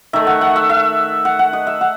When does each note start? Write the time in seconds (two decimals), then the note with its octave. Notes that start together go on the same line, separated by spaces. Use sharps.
0.13 D#3 A3 E5
0.27 F#5
0.41 F#5
0.56 E5
0.69 E5
1.25 F#5
1.39 F#5
1.53 D#5
1.67 E5
1.81 F#5